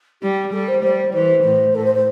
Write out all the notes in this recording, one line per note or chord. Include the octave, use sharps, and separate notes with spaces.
G3 G4
G3 A4
C5
G3 C5
E3 C5
A2
A2 A4
C5
C5